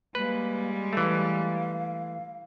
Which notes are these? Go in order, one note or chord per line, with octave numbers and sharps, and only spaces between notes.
G3 G#3 A#3 B4
E3 A3 F5